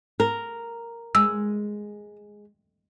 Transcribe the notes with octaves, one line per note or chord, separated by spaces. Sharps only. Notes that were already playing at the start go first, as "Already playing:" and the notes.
A#4
G#3 E6